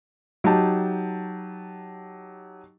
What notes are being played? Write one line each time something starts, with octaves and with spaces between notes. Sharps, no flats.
F#3 D#4 G4 A5